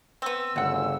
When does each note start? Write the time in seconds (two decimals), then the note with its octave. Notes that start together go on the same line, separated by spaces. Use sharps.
0.22 B3 C4 E6
0.56 G1 D2 C#3 F#5